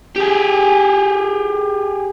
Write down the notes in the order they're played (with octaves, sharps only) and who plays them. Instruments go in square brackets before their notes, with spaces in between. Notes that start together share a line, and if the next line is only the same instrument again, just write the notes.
[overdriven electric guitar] G4 G#4